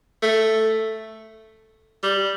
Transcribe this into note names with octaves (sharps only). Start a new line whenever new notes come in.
A3
G3